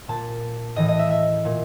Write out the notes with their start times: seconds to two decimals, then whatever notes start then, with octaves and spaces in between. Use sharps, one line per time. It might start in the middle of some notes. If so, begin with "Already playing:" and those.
0.08 A#2 A5
0.76 A2 E3 D#5
0.88 D#5
0.99 E5
1.10 E5
1.45 A#2